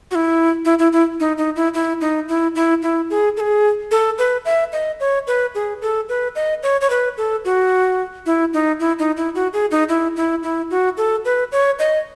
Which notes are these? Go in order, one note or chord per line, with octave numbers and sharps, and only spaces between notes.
F#4
E4
E4
E4
E4
D#4
D#4
E4
E4
D#4
E4
E4
E4
G#4
A4
G#4
A4
B4
E5
D#5
C#5
B4
G#4
A4
B4
D#5
C#5
C#5
B4
A4
F#4
E4
D#4
E4
D#4
E4
F#4
G#4
D#4
E4
E4
E4
F#4
A4
B4
C#5
D#5